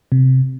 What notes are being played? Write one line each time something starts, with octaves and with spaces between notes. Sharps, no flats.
C3